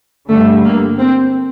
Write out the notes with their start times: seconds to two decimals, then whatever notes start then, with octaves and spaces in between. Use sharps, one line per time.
0.29 G2 D3 G3 A3
0.64 A#3
0.99 C4